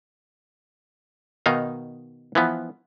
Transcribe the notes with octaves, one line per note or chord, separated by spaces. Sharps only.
B2 D#3 D#4 F5
E3 F3 B3